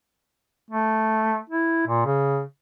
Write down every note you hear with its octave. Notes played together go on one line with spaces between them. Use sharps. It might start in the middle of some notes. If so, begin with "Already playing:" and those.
A3
E4
A#2
C#3